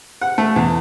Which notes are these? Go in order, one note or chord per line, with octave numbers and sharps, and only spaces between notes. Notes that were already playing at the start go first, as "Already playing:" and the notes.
F#5
A3
E2